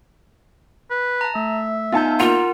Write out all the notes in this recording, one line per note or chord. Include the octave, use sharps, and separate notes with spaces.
B4
A5 A#5
A3 E5
B3 D#4 F4 G#5 A5 G6
A#3 F4 A#4 F#5 F7